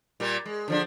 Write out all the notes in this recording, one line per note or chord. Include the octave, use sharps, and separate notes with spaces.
A#2 G3 A#3
G#3
D3 F3 D4